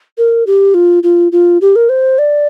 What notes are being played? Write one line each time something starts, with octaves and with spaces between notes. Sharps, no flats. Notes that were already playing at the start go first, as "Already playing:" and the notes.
A#4
G4
F4
F4
F4
G4
A#4
C5
D5